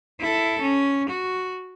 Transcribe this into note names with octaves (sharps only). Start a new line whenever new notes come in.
E4 A4
C#4
F#4